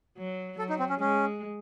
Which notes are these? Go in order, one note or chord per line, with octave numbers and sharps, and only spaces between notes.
F#3
F#3 A4
D#4
C4
C#4
G#3 C#4